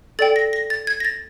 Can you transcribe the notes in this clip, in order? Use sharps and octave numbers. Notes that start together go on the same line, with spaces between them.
A4 D5 G5 A6
A#6
A#6
A6
G#6
A#6
A6